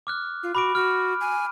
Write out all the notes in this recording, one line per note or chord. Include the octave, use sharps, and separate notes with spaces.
D6 F6 F#6
F4
F#4 B5 D6 D7
F#4 F6
G#5